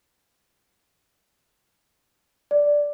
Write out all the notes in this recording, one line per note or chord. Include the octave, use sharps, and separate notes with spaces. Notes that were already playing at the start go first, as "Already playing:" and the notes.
D5